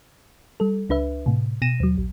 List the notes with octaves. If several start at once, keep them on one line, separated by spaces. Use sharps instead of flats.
G3 A4
C#2 D4 B4 E5
A2 C3
B2 A#6 D#7 E7
D#2 F#3
A#1